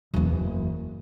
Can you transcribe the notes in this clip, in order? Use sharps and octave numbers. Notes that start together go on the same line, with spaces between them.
F#1 E2